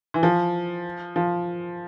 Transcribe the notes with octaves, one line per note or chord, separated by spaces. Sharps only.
E3
F3
F3